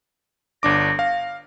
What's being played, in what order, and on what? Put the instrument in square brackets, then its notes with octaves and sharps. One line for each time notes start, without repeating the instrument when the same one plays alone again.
[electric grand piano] G1 D4 D6 [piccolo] A#6
[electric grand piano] F5